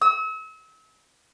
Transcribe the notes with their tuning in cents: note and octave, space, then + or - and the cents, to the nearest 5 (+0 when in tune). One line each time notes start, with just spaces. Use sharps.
E6 -40